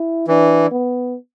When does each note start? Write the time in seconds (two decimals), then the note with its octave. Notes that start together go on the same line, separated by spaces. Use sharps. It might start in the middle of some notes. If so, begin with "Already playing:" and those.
Already playing: E4
0.28 E3 D4
0.71 B3